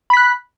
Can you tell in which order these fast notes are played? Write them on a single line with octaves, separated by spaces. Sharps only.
B5 B6 F#6